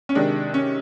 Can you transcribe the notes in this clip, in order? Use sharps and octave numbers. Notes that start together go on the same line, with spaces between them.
C#4
C3 D#3 G#3 D4
C#4